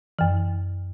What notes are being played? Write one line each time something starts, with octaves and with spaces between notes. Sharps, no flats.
F#2 E3